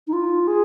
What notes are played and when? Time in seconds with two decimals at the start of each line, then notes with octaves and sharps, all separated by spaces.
0.07 D#4
0.13 F4
0.47 G#4